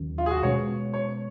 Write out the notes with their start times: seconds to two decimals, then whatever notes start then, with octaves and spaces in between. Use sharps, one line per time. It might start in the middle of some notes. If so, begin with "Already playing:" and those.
Already playing: D#2 D#3 F#3 C#4
0.18 F4
0.26 G#4
0.31 F#4
0.43 B2 G#3 C#4 C#5
0.94 C#5